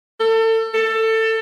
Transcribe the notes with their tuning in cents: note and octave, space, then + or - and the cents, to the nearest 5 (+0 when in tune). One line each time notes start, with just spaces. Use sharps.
A4 +30
A4 +20